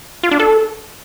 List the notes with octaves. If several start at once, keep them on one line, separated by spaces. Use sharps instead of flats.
F4
D4
A4